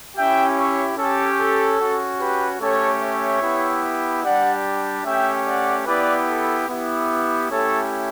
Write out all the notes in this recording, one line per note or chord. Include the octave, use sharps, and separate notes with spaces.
C#4 E4 G4 E5 G5
C#5 E5
C#4 G4 A4
A4
C#4 F#4
G4 B4
A3 C#4 G4 A4 C#5
C#5 E5
B3 E4 G4
G3 D4 G4 D5 F#5
A3 C#4 G4 E5 G5
D5 F#5
B3 E4 G4 B4 D5
A4
B3 E4 G4
A3 C#4 E4 G4 A4 C#5